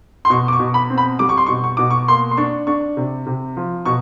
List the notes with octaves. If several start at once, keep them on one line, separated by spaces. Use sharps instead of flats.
C6
B2 C#6
D6
C#6
B2
B5
C4
B5
G3 D6
C#6
C6
B2 C#6
C#6
B2 D6
C#6
A#3 C6
C6
D4 C#6
D4 C#6
C3
C3
F3
B2 C#6